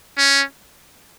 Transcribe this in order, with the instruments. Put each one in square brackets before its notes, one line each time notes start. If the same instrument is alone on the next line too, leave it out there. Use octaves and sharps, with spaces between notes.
[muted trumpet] C#4